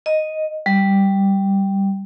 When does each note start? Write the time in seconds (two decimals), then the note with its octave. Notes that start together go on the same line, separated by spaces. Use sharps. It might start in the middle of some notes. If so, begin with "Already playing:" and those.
0.06 D#5
0.66 G3